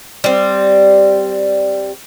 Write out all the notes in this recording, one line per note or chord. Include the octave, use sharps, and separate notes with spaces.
G3 C4